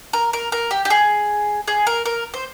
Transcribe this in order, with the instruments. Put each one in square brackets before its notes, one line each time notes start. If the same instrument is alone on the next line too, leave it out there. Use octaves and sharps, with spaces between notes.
[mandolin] A#4
A#4
A#4
G4
G4
G#4
G#4
A#4
A#4
C5